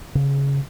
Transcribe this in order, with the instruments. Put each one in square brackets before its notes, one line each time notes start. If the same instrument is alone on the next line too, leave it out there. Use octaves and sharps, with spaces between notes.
[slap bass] C#3